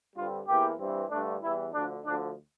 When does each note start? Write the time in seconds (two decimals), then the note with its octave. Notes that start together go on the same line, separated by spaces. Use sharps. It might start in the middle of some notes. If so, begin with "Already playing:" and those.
0.15 G2 D3 G3 C4 F4
0.46 E2 E3 A#3 G4
0.78 G2 E3 G3 C4
1.10 G2 D3 A3 D4
1.42 E2 E3 G3 E4
1.73 D2 D3 F3 D4
2.06 D2 D3 F3 D4